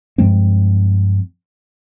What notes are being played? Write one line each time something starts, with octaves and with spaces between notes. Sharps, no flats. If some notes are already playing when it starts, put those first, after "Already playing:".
G2 F3 G#3 C4